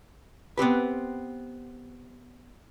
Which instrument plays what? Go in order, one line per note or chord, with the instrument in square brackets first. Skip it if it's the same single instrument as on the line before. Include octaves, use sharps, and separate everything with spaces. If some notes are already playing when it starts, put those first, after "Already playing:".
[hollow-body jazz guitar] B3 C4 G4 B4